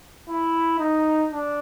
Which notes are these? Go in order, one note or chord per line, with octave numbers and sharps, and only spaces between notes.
E4
D#4
D4